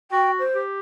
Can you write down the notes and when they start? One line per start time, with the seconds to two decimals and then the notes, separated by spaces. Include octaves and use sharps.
0.11 F#4 G5
0.40 C5
0.55 G4